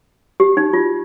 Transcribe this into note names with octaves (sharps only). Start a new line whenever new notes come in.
G4
D#4
F4